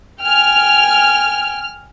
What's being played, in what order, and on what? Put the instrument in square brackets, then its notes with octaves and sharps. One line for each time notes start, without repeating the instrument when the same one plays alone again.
[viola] G5 G#5 [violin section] F6